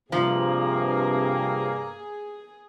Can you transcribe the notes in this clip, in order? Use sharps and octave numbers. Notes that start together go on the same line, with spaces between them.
G2 C3 F3 A#3 G#4